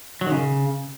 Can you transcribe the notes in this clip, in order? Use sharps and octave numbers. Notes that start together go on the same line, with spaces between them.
F#3
D#3
C#3